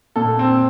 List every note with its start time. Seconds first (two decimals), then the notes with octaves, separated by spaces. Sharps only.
0.16 A#2 A4
0.39 C4